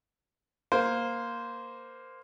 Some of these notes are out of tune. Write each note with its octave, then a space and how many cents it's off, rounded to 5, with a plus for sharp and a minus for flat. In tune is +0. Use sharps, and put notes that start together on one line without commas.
A#3 +5 C5 -10